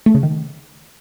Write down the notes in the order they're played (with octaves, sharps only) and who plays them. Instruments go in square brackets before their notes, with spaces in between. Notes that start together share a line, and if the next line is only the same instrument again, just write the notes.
[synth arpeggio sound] A3
C#3
D#3